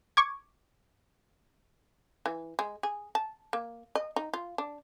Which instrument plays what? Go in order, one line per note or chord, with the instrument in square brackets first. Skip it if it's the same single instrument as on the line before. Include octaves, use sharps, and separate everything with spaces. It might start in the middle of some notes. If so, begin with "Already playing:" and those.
[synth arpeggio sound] C#6 D6 G#6
[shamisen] E3
G#3
G#4
A5
A#3
D#5
D#4
F4
D4